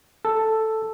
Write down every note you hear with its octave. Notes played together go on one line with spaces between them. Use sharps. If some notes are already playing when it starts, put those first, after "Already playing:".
A4